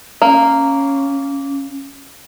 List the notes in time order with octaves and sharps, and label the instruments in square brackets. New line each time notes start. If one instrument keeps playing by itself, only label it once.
[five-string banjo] A#3 [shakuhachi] C#4